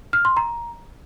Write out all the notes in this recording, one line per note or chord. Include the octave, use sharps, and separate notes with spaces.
F6
C6
A#5